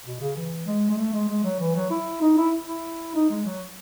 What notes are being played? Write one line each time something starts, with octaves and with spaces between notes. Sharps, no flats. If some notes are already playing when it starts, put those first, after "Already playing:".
B2
C#3
E3
G#3
G#3
A3
G#3
G#3
F#3
E3
F#3
E4
D#4
E4
E4
D#4
G#3
F#3